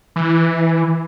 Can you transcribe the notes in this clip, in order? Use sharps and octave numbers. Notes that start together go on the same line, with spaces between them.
E3